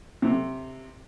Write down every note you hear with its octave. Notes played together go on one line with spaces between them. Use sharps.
C3